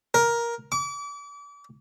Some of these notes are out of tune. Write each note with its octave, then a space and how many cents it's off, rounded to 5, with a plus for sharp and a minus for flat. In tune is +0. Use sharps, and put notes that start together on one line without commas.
A#4 +10
D6 -35